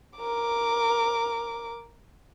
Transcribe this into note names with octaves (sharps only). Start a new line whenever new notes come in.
A#4 D6